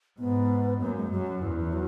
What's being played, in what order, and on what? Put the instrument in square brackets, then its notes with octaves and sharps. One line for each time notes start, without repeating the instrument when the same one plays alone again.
[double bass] G#2 [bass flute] B3
[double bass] F#2 [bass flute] A#3
[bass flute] G#3
[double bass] F#2 [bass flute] F#3
[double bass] E2 [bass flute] E3
[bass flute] E3
F#3